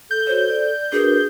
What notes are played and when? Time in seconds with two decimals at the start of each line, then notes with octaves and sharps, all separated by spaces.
0.11 A4 G6
0.27 F#4 C5 C#5
0.50 D5
0.92 D4 F#4 G#4 A#4 B4